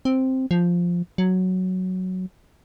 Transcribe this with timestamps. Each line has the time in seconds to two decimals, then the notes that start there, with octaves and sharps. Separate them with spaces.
0.05 C4
0.51 F3
1.18 F#3